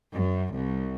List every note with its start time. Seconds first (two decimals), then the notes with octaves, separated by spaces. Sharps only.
0.13 F#2
0.56 C2